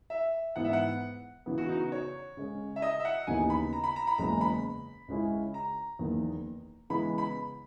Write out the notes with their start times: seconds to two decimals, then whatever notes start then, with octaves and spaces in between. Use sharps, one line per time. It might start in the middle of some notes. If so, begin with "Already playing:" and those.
0.10 E5
0.56 G#2 E3 B3 F#5
0.64 E5
0.73 F#5
1.46 C#3 E3 B3
1.58 F#4
1.69 D#4
1.80 F#4
1.92 C#5
2.37 C#3 G#3 C#4
2.76 E5
2.82 D#5
3.00 E5
3.05 F#5
3.27 D#2 C#3 E3 B3 D#4 G#5
3.50 B5
3.73 A#5
3.84 B5
3.96 A#5
4.07 B5
4.18 F#1 E2 C#3 G#3 A#5
4.41 B5
5.08 C#2 C#3 G#3 C#4 E4
5.54 A#5
5.99 F#1 E2 D#3 A#3
6.90 C#3 E3 G#3 B3 B5
7.18 B5